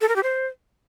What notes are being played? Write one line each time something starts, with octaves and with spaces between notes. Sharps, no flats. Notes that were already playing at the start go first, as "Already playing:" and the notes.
A4
A#4
G4
C5